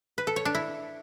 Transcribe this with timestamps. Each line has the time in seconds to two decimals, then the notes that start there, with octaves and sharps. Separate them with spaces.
0.18 B4
0.27 A4
0.36 C#5
0.45 D4
0.55 E4